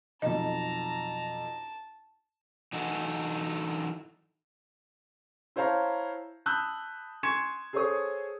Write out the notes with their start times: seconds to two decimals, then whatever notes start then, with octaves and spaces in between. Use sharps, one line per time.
0.22 B1 F2 D#5 A5 A#5
2.73 E3 D#4 F#4 A4
5.56 E4 C5 C#5 F5 A5 A#5
6.46 A5 B5 D#6 E6 F#6 G6
7.23 G#5 C6 C#6 G#6 C#7 E7
7.73 G#4 A4 C5 C#5 C#6 D#6